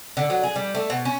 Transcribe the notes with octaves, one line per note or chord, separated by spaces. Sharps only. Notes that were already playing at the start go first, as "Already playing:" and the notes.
D3
F#3
G#4
G3
A3
B2
C#4